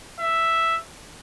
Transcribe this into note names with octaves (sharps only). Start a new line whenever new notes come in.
E5